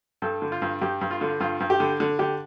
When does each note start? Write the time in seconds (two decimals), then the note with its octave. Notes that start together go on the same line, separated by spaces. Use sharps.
0.22 G2 A4
0.42 D3
0.52 F4
0.62 G2
0.81 G2 G4
1.01 G2
1.11 F4
1.21 D3
1.40 G2 F4
1.60 G2
1.70 G4
1.80 D3
2.00 D3
2.19 D3 G4